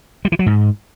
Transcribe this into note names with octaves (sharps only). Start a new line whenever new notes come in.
G3
E3
F#3
G#2